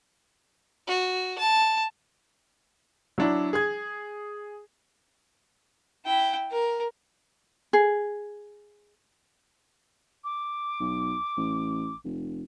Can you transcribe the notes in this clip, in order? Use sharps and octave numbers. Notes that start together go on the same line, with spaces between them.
F#4
A5
F#3 D4 E4
G#4 G#6
E4 G5
A#4
G#4
D6
B1
A1
F1